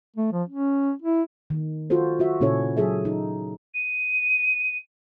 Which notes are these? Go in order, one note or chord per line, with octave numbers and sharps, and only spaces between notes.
A3
F3
C#4
E4
D#3
F4 F#4 A4 C5
F4 F#4 E5
A#2 C#3 C#4 E4 A4 C#5
F#3 G#4 A4 E5
D#4
D#7